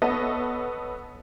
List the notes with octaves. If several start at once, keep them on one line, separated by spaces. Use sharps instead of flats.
B3 A4 C#5 D#5